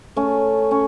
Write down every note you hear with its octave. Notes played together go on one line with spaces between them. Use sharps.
A3 C#4
C#4